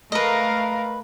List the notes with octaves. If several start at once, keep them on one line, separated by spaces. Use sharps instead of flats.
A3 A#4 B4 D#5 F5